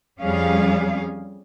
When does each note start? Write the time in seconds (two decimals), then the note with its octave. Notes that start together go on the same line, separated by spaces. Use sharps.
0.19 F2 G3 C#4 G#4 F5